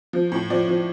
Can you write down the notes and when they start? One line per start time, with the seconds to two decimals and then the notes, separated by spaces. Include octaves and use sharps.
0.13 F3
0.32 A2
0.50 F3 D5
0.68 F3